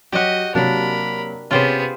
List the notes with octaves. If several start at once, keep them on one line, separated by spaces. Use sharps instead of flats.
F#3 F#4 G4 D#5
C3 F#3 A#3 D4 A#4 B5
C3 B3 C#4 F4 G4 G#4 C5